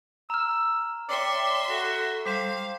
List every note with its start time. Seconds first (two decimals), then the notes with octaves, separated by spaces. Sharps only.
0.30 A#5 E6 F6
1.09 C#5 D5 E5 G5 C6 D6
1.69 F#4 A4
2.26 G3 C5 F5 D6 B6 E7